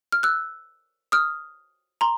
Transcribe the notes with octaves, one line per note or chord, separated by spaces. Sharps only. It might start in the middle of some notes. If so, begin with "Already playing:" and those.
F6
E6 F#6
D#6 F6
A#5 C6